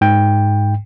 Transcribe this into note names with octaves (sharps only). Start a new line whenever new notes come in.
G#2 G5